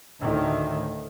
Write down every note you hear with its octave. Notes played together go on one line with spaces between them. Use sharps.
D2 A2 D#3